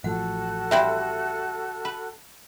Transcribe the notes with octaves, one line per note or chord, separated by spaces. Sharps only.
A1 F3 F#4 A4 F#5 F#6
G3 C4 E4 E5 F#5
B4